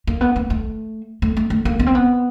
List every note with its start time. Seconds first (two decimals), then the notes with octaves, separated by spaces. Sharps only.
0.07 A#3
0.21 B3
0.36 A#3
0.50 A3
1.22 A3
1.37 A3
1.50 A3
1.65 A#3
1.79 B3
1.86 C4
1.95 B3